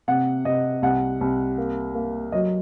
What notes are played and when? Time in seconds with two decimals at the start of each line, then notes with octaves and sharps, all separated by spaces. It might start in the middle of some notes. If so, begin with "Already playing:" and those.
0.08 C3 F#5
0.45 C3 D#5
0.82 C2 F#5
1.21 C2
1.58 A#3
1.95 A#3
2.32 F#3 D#5